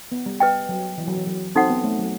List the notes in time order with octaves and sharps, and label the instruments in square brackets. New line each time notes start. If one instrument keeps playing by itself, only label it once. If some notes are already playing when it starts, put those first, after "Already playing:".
[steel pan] B3
G3
[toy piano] B4 D#5 G5
[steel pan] F#3
E3
F#3
E3
F#3
[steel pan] C4 [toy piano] D#4 F#4 A4 C5 F#5
[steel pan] B3
A3
F#3